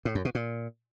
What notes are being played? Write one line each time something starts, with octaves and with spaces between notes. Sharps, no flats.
A2
F#2
B2
A#2